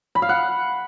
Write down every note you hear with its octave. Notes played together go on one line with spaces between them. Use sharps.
B5
F5
F#5